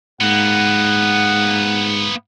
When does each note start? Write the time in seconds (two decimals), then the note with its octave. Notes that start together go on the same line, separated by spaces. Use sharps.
0.21 G#2 A#3 B3 F#5